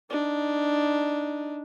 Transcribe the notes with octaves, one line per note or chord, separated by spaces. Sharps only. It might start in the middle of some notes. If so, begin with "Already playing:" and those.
D4 D#4